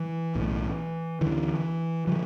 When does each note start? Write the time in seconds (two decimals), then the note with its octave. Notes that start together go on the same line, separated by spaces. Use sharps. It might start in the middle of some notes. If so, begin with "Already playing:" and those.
Already playing: E3
0.35 B1 A2
1.21 D2 D3 E3
2.07 D3 F3